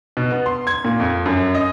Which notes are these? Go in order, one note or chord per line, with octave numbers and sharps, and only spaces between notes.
B2
B3
C6
G#6
A#2
F2
F#2
D#5